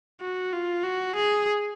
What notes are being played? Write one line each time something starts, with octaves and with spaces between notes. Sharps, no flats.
F#4
F4
F#4
G#4